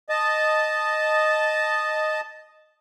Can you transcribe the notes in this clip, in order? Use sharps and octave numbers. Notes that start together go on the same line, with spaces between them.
D#5 A5